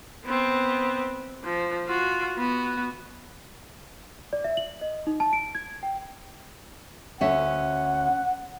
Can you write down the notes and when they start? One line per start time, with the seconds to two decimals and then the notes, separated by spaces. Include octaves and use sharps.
0.24 B3 C4
1.44 F3
1.86 F4 F#4
2.37 B3 F#4
4.33 D5
4.44 E5
4.57 F#7
4.81 D#5
5.07 D#4
5.20 A5
5.33 D7
5.55 G#6
5.83 G5
7.21 D2 C#4 E5 F#5